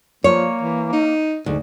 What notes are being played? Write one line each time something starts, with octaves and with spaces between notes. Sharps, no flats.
F3 A#3 C#5
E3
D#4
D2 G#2